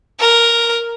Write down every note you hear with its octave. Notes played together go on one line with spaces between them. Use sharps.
A#4